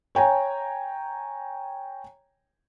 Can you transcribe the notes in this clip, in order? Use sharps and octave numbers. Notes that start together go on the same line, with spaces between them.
C#5 G5 G#5 A#5